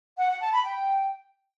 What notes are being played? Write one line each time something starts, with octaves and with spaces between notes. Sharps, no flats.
F#5
F#5
A5
B5
G5